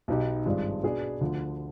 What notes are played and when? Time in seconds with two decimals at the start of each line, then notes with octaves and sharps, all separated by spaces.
0.08 B1 B2 B3 D#4 G4
0.46 G#1 G2 F3 G#3 D4
0.83 B2 B3 D4 G#4
1.21 D2 D3 F3